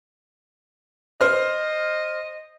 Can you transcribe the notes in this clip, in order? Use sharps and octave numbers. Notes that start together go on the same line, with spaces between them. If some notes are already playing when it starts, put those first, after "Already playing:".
C5 D#5 F6